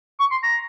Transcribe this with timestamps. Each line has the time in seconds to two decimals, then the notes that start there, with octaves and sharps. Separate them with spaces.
0.20 C#6
0.31 C6
0.43 A#5